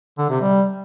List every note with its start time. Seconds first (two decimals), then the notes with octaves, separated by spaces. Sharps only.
0.18 D3
0.30 C3
0.42 G3